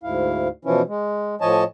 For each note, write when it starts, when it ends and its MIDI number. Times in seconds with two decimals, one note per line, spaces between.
0.03 0.48 38
0.03 0.48 44
0.03 0.48 64
0.03 0.48 77
0.65 0.82 47
0.65 0.82 52
0.65 0.82 53
0.65 0.82 61
0.65 0.82 64
0.87 1.35 56
1.41 1.64 45
1.41 1.64 53
1.41 1.64 73
1.41 1.64 75
1.41 1.64 80
1.41 1.64 81